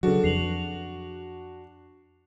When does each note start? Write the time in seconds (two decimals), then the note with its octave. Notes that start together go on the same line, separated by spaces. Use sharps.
0.03 C#3 F#3 D4 F#4 G#4 A4 B4
0.24 F2 C7 F7 F#7